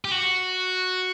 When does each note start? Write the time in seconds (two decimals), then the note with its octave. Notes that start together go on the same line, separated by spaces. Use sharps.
0.05 G4
0.12 F#4